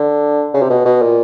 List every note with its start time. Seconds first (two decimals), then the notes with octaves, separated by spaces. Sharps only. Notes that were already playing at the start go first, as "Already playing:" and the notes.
Already playing: D3
0.54 C#3
0.62 C3
0.70 B2
0.85 B2
1.02 A#2